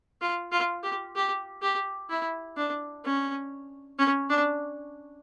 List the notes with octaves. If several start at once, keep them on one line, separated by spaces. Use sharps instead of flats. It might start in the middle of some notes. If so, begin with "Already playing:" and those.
F4
F4
G4
G4
G4
E4
D4
C#4
C#4
D4